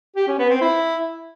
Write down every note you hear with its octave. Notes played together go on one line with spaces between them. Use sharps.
G4
C#4
B3
C4
E4